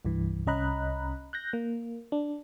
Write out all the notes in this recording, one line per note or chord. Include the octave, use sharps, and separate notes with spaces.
C2 G2 E3
C2 C#4 D#5 A#5 B5 F#6
F#6 G6 A#6
A#3
D4